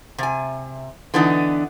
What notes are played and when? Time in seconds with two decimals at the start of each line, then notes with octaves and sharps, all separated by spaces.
0.18 C3 G#5
1.14 D3 E3 B3 D4 D#4